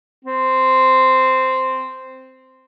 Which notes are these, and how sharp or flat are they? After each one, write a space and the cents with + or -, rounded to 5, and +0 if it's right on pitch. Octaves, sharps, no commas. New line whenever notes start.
C4 -5